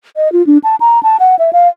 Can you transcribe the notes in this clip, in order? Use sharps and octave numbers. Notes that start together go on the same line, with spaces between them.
D#5
F4
D4
A5
A#5
A5
F#5
E5
F5